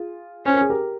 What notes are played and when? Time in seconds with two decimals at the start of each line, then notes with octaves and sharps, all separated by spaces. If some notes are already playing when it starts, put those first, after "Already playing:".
Already playing: F4 G#4
0.46 C#4 C5
0.53 A#4
0.61 G#4
0.70 G4 A#4